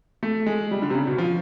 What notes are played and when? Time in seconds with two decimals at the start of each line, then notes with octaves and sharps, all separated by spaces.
0.23 A3
0.46 G#3
0.71 G3
0.82 D3
0.90 C3
0.95 C#3
1.07 B2
1.18 F3